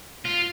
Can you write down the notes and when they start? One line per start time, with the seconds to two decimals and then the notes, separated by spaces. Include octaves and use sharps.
0.25 F4